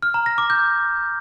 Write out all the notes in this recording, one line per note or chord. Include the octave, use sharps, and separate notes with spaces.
F6
A#5
A#6
D6
G6